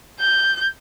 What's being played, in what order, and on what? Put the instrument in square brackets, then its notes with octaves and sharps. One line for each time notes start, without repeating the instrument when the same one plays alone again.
[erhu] G6